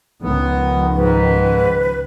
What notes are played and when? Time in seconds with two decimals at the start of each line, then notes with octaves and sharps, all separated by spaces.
0.22 C#2 D#3 F3 B3
0.94 G#2 B4